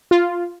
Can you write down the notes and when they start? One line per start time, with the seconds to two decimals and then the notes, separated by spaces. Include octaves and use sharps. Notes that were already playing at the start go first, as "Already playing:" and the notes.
0.11 F4